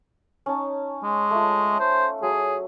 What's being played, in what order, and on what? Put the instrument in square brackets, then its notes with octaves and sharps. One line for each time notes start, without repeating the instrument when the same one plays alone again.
[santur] C#4 D#4 A5
[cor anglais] G#3
[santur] A3 F4
[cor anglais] C5
[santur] F#3 [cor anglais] G#4